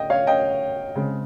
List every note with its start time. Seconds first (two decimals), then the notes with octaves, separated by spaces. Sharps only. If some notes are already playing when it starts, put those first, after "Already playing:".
Already playing: D#5 G5
0.10 C#5 F5
0.27 D#5 G5
0.95 C#3 G#3 C4